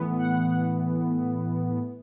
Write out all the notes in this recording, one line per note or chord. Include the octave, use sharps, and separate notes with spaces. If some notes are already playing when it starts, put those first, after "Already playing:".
Already playing: A2 E3 B3
F#5